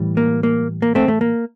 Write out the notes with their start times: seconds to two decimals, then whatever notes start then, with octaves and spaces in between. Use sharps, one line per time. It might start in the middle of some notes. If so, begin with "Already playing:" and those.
Already playing: A2 E3 G3
0.17 A#3
0.43 A#3
0.82 A#3
0.95 A3 C4
1.08 A3
1.21 A#3